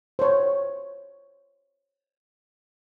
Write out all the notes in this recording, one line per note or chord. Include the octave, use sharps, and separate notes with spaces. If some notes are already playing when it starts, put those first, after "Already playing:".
C5 C#5